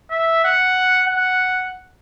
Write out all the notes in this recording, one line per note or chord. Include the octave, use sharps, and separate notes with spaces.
E5
F#5
F#5